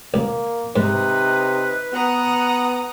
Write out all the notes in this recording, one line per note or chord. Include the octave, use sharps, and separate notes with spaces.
C#2 A#3
G#2 C3 D#4 B4
B3 F#5 A#5 D#6